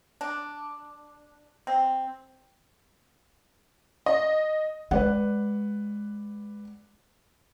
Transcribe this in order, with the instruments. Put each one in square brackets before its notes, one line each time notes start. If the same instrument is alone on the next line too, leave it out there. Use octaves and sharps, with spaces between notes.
[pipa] D4
C4
[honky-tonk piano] D#5
[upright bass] G#3 [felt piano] B4 D5 F#5